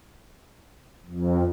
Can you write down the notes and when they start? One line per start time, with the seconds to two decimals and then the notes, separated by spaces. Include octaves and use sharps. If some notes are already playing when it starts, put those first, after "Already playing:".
1.06 F2